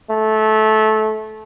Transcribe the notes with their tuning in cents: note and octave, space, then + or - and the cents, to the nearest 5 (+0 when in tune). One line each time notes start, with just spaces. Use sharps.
A3 -20